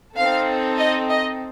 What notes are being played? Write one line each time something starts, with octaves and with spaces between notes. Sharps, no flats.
C4 D#4 A4 F5
D#5
D#5